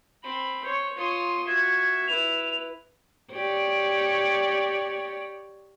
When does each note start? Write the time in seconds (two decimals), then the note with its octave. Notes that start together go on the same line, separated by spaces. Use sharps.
0.23 C4 B5
0.62 C5 C#5
0.97 F4 C#5 C6 D#6
1.48 F#4 E5 G#6
2.08 E4 B4 F7
3.33 G4 C#5 D5